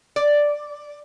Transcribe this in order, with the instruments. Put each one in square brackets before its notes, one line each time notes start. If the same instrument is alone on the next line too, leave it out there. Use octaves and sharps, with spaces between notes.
[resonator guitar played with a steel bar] D5